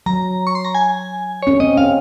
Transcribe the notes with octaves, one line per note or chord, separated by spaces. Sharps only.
F#3 A#5
C#6
C6
A#5
G#5
C#4 C#5
C4 D#5
C#4 F5